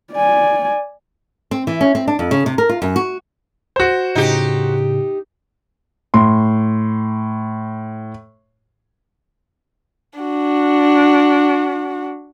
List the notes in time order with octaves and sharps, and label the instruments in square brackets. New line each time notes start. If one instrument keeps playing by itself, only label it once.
[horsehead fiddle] D5 G#5
[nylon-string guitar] C4
E3
C#4
C4
D4
F2
C#3
C3
A#4
F4
F#2
F#4
[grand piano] F#4 C5
[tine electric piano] A2 C#3 [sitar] D#4 G4
[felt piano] A2 C6
[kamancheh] D4 F#4